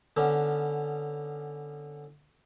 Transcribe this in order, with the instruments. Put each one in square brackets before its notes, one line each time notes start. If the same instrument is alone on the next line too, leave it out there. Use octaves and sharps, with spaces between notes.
[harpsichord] D3 B3 C#4 D4